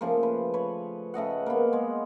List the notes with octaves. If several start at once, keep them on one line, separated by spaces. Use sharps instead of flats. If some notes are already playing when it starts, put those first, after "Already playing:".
C#3 F3 A3 A#3
B4
B4 C#5
C#3 A3 D#5 F#5
A#3 B3
G#3